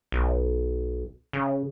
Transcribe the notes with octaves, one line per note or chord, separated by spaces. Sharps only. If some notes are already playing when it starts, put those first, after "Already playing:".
B1
C#3